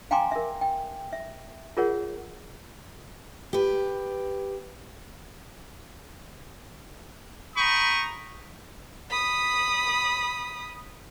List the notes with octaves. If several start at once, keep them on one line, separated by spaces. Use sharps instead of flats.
F5 G5 G#5 A#5 C6 D6
A#4 E5
G5
E5
F4 G#4 A#4 C#5 F#5
G4 B4
G5 A#5 B5 C#6 D#6
B5 D#6